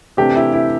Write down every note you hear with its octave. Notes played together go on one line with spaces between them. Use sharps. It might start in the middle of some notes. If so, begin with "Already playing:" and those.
C3 E3 A3 D4 G4
E4
E4